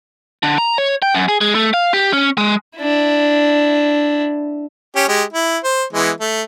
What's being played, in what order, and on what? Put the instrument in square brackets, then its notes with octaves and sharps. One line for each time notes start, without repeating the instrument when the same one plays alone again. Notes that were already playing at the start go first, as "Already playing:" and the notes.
[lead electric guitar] D3
A#5
C#5
G5
F#2
G#4
G#3
A3
F5
G4
C#4
G#3
[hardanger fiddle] D4 E4
[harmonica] C#4 G4
G#3 G4
E4
C5
E3 G#3 B3
A3